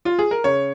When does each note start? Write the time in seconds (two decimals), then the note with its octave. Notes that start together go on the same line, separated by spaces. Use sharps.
0.05 F4
0.19 G#4
0.31 A#4
0.44 C#3 C#5